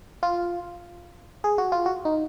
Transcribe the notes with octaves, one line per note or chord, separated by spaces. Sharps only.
F4
G#4
F#4
F4
F#4
D#4